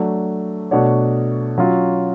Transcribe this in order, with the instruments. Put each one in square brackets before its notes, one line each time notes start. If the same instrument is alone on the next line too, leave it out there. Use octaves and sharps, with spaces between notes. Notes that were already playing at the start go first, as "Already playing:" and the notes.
Already playing: [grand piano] F#3 A3 D4
B2 A3 D4 F#4 C#5
F#3 C#4 F4